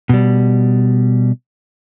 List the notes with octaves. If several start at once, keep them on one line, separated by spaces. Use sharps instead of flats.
B2 G3